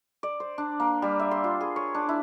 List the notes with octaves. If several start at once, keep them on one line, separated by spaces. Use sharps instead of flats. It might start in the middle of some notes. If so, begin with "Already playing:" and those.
D5
C5
D4
A#3
G3
E5
C6
F4
G#4
C#5
D4
E4